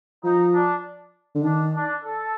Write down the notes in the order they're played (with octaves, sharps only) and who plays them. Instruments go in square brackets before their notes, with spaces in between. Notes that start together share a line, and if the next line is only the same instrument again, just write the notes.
[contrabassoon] F3 [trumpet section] D#4
[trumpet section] D4
[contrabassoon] D3
[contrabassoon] D#3 [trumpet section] D4
[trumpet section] D4
A4